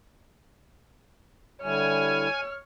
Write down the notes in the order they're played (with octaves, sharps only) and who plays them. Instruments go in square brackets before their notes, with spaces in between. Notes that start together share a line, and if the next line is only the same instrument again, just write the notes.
[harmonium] D3 G3 E4 [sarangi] C#5 [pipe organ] G#5 [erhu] F6